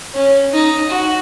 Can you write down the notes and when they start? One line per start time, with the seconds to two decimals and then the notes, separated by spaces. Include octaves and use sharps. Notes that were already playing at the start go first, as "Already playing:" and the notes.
0.14 C#4
0.52 D#4
0.90 F#4